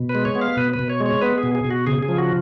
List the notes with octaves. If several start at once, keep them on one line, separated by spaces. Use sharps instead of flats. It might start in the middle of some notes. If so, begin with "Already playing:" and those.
Already playing: B2
B4
G#3
C#5
B3
F5
B2 B4
B4
B2
C#5
G#3
C#5
B3 B4
G#4
B2
G#4
B2
F#4
C#3 G#4
G#4
F3
F#4